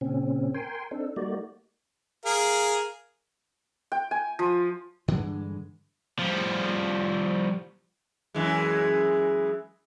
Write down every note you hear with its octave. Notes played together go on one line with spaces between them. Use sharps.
A#2 C#3 C4 C#4
A#4 G5 G#5 C6
C4 D4 D#4 A4
G3 A3 A#3 D#4 F#4 D5
G#4 A#4 F5
G5
G#5
F3
G2 D3 E3 G#3
F3 G3
F#2 E3 G#3